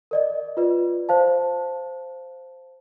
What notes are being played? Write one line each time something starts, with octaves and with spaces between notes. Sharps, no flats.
A#4 D5 D#5
F4 B4 D5
C5 F5 A5